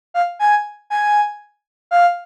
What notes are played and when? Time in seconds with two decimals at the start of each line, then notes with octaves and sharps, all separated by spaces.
0.14 F5
0.39 G#5
0.90 G#5
1.91 F5